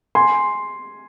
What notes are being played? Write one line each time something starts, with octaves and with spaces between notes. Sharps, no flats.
G#5 C6